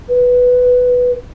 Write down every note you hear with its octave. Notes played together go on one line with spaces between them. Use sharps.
B4